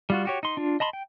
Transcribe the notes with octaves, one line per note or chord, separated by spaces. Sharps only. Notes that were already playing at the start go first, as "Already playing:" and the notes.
G3 F4 F#4
F#4 G4 C#5
D#4 C6
D4 F4
D#5 A5 B5 C6
G5